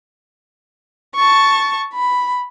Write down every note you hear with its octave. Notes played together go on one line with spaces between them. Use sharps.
A5 C#6
B5